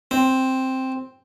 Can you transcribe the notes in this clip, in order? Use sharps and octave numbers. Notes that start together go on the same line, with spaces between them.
C4